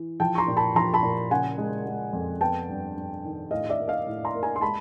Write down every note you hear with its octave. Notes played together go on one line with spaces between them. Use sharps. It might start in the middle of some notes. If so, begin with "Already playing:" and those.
Already playing: E3
F3 G5 A5
C#6
A#5 C6
A#2
A5 B5
F3 A#5 C6
A5 B5
A#2
C#3 F#5 G#5
G#3
G#3
F2
B3 G5 A5
G2
G2
D#3
A2 D#5 F5
D5 E5
A#3
D#5 F5
A2
A#5 C6
A#3
G#5 A#5
C6
G#3 A5 B5